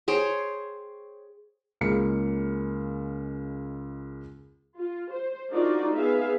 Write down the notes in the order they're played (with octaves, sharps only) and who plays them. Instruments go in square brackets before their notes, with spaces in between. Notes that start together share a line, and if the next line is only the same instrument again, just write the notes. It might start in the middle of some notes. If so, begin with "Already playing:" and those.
[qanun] G#4 C5 C#5 G5
[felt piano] C#2 C#3 G#3 A#3 F5 C#7
[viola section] F4
C5
D4 D#4 F4 F#4 A#4 D5
B3 G#4 E5 F5